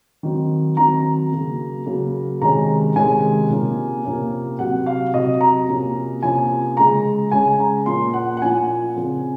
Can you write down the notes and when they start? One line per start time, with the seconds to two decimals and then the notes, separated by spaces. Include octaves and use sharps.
0.23 D#3 F#3 C4
0.77 D#3 F#3 C4 A#5
1.32 C#3 F#3 A#3
1.86 C#3 F#3 A#3
2.41 C3 D#3 G#3 C#4 A#5
2.96 C3 D#3 G#3 C#4 G#5
3.50 C3 F3 A#3 C#4
4.04 C3 F3 A#3 C#4
4.59 C3 F#3 C4 F#5
4.86 F5
5.14 C3 F#3 C4 D#5
5.41 A#5
5.68 C3 F3 A#3 C#4
6.23 C3 F3 A#3 C#4 G#5
6.77 C#3 G#3 C#4 A#5
7.32 C#3 G#3 C#4 G#5
7.60 A#5
7.86 A#2 F3 A#3 C#4 C6
8.13 F#5
8.37 F#5
8.42 A#2 F3 A#3 C#4 G#5
8.96 C#3 F3 C4